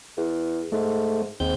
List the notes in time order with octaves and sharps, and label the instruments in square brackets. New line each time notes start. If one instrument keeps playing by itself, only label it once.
[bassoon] E2
[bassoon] G#2 [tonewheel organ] A3
[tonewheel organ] D#2 C4 G6 [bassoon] G#2